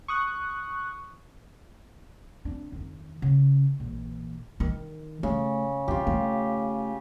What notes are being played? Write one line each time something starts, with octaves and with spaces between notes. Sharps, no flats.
C#6 D#6 F#6
C4 D4
F2 D#3
C#3
A#1 E3
D#3
C#3 A3
C4 F4 G4
A3